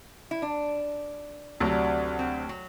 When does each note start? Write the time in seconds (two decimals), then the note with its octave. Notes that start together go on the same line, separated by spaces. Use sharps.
0.31 E4
0.42 D4
1.60 D2 C3 F#3 D4
2.19 C4
2.49 F#3